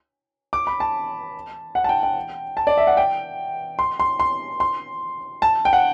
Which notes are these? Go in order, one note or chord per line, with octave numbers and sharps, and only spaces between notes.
D6
B5
A5
F#5
A5
G5
G5
A5
D5
E5
F#5
G5
C6
C6
C6
C6
A5
G5
F#5